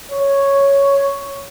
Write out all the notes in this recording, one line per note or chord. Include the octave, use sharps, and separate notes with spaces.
C#5